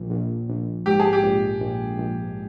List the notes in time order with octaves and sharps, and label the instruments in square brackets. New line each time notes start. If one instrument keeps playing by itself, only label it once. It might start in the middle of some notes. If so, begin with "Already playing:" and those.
Already playing: [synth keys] A#1
A#1
A#1
[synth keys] G#2 [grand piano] G4
[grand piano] G#4
G4
[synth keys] A#1
A#1
A#1